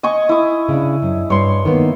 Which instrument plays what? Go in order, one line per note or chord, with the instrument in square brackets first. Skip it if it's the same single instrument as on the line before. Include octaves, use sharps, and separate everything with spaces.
[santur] D#5 G#5 C#6
E4 D#6
[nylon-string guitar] C#3 D4
F#2
[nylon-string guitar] G2 [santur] C#5 C6
[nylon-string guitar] D#3 A#3 B3